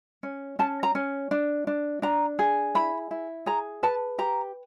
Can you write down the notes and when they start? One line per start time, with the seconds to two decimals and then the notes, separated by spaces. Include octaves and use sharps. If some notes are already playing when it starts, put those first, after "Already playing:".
0.23 C#4
0.59 C#4 A5
0.83 A#5
0.95 C#4
1.31 D4
1.67 D4
2.02 D4 A#5
2.39 G#4
2.75 E4 B5
3.11 E4
3.46 G#4 A#5
3.83 B4 A5
4.18 G4 A#5